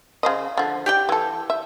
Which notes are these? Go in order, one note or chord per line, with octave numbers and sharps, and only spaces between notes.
C#3 C5 D#5
D3 F3
G4 D5 G5
E3 A4
E5